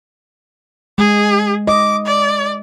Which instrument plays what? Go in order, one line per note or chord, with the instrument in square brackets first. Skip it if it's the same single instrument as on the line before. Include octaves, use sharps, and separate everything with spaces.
[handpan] G#3 [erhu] G#4
[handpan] D#5 [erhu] D6
[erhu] D5